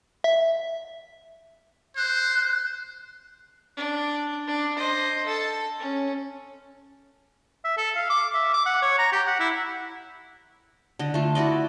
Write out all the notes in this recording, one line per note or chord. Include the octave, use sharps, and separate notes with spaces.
E5
C5 F#6
D4
D4
C5 D#5
A4 A5
C#4
E5
A4
F5
D6
E5
D6
F#5
C#5
A#5
G4
F#5
E4
D3 D#5
A3 F4
E4 F#4 D5 D#5